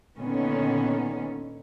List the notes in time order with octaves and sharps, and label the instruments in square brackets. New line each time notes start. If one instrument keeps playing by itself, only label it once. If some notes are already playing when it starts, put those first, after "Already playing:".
[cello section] A#2 D3 D#3 B3 C#4